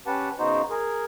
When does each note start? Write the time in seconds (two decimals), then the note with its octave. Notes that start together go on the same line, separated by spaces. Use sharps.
0.07 C#4 G4 B4 F#5 A5
0.39 C#3 B3 D#4 F#4 C5
0.70 G#4 A#4